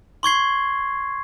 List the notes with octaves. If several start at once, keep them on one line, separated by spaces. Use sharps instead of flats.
C6 C#6 G#6 C7